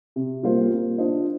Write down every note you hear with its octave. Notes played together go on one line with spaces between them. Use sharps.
C3
G3 A#3 F4 C5
A#3
D4 F4 C5 D#5